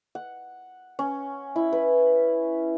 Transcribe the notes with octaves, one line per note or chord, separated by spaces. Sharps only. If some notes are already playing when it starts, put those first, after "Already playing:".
F#5
C#4
E4
B4